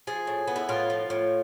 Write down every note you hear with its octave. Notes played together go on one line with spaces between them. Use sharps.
F3 G#4
A2
B3
E4
A2 F4
F3
A2